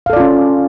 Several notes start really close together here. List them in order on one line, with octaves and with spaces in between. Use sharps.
F5 A4 D5 F4 C#4